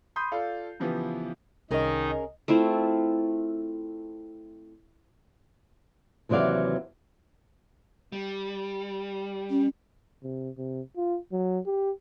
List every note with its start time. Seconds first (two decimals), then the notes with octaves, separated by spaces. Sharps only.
0.16 B5 C6 D#6 G6
0.32 F4 A4 D5 F5
0.80 C#3 E3 F3 B3 G4
1.71 C2 D#3 C#4 D#4 G#4 A#4 D#5
2.48 A3 C4 E4 F4
6.29 D#2 C3 E3 F#3 D5 F5
8.12 G3
9.50 C#4
10.23 C3
10.57 C3
10.97 F4
11.32 F#3
11.66 G4